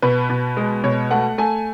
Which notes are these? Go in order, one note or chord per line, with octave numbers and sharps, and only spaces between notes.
B2 B4
B2
G#3
B2 C#5
A3 F#5
A3 G#5